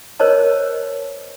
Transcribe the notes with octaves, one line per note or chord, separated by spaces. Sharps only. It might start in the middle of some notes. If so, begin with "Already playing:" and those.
A#4 C5 C#5 D#5 A5